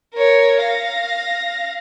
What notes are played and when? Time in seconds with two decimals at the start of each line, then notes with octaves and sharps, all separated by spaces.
0.15 A#4 C#5
0.62 F5 A#6